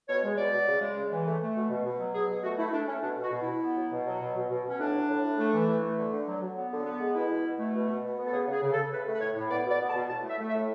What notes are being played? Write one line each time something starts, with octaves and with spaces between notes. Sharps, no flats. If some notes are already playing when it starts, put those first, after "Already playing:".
B2 C#5
G#3
B2 D5
B2
C#3
G#3
C#3
E3
A3
A3
B2
B2
B2
F#3
B2 G#4
B2
A3 F#4
A3 E4
A3 D4
A3 C#4
B2 D4
B2
F#4
B2
E4
B2
B3
F#3
B2
F#3
B2
B2
B2
B2 C#4
A2 D4
F#3
A2
A2
A3
E3
E3
A3
D3
D3
F#3
F#3
B3
D3
B3
G#3
B2 E4
B2
B2
A3
B2
B2
B2
B3
A4
C#3 G#4
C#3
G#4
C#3
A4
C#3
A2 B4
A3
B4
A2 C#5
A2
B3 D5
B2 D5
B3
A5
B2
A2 A5
A3
E5
A3
E5
A2